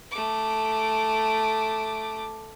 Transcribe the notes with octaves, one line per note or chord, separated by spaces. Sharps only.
A3 D6